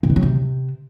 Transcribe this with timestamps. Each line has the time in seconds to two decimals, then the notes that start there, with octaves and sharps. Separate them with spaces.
0.03 A#2
0.10 B2
0.16 F#3
0.22 C3